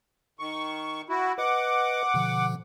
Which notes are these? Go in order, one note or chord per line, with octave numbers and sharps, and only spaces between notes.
D#3 C#6
E4 F#4
B4 D#5 F#5 D6
B2 D3 F3